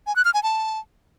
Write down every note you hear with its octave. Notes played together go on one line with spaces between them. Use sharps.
G#5
F#6
F6
G#5
A5